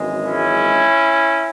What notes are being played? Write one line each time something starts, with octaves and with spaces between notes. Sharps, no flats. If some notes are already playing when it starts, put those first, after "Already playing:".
Already playing: G#1 F#2 E3 G#3
C#4 E4